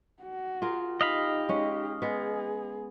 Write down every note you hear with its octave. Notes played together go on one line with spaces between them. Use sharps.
F#4
F4 G#4 A#4
D#4 G4 D#5 F5 B5
G#3 C#4
G#3 B3 G#4